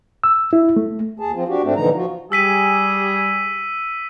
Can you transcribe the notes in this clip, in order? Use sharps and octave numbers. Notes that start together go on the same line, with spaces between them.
E6
E4
A3
D#2 G#4 A5
F3 C4 F4
D4 F#4 G4
G#2 A3 C4 D4
A#2 D3 E3 F3 D#4 A#5
F3 F4 F#4
G3 G4 G#4 E6 B6 D#7